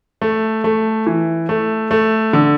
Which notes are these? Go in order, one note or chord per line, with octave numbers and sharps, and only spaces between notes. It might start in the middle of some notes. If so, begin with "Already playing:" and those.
A3
A3
E3
A3
A3
D3